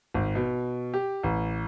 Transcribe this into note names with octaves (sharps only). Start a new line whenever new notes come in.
G#1
B2
G4
A1